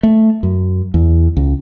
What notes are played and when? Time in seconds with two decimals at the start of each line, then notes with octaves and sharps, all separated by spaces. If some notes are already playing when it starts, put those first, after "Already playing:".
0.03 A3
0.43 F#2
0.94 E2
1.37 C#2